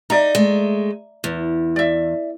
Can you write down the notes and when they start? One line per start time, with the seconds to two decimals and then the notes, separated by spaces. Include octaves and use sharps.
0.10 D#4 D5 E5 A#5
0.35 G#3 A3
1.24 E2
1.76 D5 E5